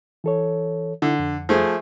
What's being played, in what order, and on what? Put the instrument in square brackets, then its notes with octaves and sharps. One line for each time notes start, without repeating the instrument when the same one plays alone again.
[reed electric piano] E3 A4 C#5
[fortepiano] D3 [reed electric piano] E4
[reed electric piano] F2
[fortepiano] F3 A3 G#4